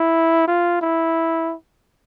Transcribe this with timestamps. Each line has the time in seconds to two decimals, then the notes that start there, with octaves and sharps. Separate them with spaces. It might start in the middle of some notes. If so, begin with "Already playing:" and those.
Already playing: E4
0.48 F4
0.82 E4